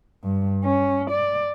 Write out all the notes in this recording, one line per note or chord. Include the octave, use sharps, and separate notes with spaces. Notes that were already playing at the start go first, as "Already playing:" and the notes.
G2
C#4
D5